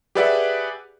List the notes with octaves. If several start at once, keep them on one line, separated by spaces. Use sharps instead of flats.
G4 G#4 B4 D5 E5 F#5